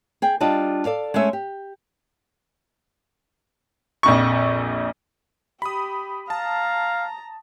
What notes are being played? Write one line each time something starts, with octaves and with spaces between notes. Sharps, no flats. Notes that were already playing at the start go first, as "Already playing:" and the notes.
G#4 G5
G3 D4 F4 D#5 A5
A4 D5 F5
G#3 A3 C#4 E5
G4
A#1 F2 C#6
G4 B5 D#6
F5 A5 A#5